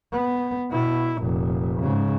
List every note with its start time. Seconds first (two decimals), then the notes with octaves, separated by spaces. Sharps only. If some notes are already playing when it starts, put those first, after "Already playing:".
0.13 B3
0.70 B2 E4
1.19 F1 A#2
1.80 G#2 C#3